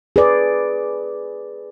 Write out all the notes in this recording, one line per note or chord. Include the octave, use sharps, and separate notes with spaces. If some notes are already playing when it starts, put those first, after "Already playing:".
G#4 B4 D5